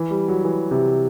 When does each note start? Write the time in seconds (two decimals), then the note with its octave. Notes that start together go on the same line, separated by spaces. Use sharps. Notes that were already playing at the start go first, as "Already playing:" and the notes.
Already playing: E3
0.11 G3
0.28 F#3
0.44 E3
0.71 C3